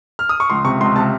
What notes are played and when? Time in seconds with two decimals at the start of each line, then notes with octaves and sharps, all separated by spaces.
0.19 F6
0.29 D#6
0.40 C#6
0.50 C#2 C6
0.65 C3 C#6
0.80 C#2 C6
0.96 C3 A5